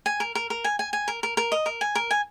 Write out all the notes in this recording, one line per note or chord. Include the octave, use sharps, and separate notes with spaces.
G#5
A#4
A#4
A#4
G#5
G#5
G#5
A#4
A#4
A#4
D#5
A#4
G#5
A#4
G#5